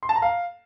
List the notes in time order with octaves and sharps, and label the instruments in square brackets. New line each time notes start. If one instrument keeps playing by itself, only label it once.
[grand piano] C6
A5
A#5
F5